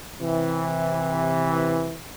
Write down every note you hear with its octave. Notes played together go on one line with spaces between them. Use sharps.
C3 E3